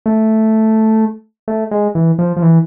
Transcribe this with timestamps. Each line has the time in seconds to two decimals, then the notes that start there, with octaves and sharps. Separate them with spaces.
0.06 A3
1.48 A3
1.71 G#3
1.95 E3
2.19 F3
2.37 F3
2.42 E3